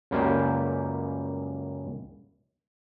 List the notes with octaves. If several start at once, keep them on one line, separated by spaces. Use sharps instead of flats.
C#2 F#2 G3 A#3 G4 C5